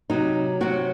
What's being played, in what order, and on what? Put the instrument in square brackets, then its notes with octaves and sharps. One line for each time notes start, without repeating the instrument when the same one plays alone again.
[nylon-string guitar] C3 F#3 D#4
C3 F#3 F#4